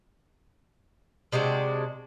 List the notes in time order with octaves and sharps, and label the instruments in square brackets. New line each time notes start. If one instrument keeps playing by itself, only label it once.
[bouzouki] C3 G#3 D4 F#4